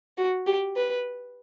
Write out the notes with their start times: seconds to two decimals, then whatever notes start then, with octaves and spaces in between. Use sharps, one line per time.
0.18 F#4
0.47 G4
0.76 B4